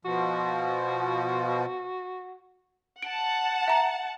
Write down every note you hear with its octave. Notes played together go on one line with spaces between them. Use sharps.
B2 F3 F#4
F#5 A5 D7
E5 A#5